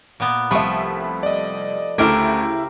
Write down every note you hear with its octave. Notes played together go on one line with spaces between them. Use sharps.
A#2 B3
C2 F3 A3 E5 B5
D5 D#5
D2 C#3 A3 E4 G4 A#4 C5 G#6